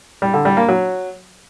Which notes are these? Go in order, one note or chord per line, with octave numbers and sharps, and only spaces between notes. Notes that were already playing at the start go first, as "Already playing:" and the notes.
G3
D3
G3
A#3
F#3